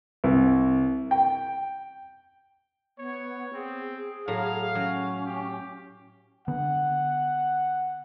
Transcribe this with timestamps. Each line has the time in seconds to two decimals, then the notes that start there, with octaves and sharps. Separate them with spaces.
0.24 C2
1.11 G5
2.98 B3 C#5
3.54 C4 G#4
3.96 G#4
4.28 A2 F#3 F5 A#5
4.75 F#3 C#4
5.26 G4
6.48 D3 B3 F#5